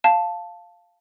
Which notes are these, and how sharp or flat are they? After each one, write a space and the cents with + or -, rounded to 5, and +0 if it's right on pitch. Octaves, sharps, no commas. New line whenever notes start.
F5 +0 A5 +0